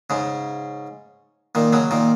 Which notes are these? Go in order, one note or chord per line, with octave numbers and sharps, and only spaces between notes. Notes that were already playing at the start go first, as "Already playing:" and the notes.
G#2 C#3
A#2 D#3
C#3 F#3
A#2 D#3